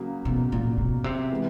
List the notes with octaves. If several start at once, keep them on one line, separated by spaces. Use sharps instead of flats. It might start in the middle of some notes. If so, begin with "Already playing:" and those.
Already playing: C#3 F#3 A#3
B2
A#2
B2
C3
E3 G#3 B3